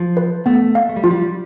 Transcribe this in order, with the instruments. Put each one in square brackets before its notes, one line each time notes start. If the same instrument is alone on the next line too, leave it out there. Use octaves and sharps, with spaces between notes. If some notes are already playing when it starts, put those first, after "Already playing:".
Already playing: [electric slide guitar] F3
[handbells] B4
[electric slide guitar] A3 [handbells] B3
[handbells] F5
[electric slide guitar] A3
G3
[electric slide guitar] F3 [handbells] F4
[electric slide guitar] G3